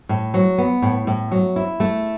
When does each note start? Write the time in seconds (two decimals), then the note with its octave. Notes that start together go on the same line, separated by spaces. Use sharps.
0.09 A2
0.34 F#3
0.58 B3
0.82 A2
1.07 A2
1.31 F#3
1.56 E4
1.80 A3